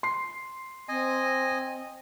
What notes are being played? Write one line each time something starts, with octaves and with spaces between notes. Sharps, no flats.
C6 C7
C4 D#5 G#5